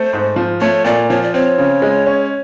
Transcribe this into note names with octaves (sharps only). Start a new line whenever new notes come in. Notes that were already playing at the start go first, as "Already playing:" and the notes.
Already playing: A3 C5
G#2
F3
A3 C#5
A#2 D5
F3 C#5
D5
C4 C#5
C#3
G#3
C#4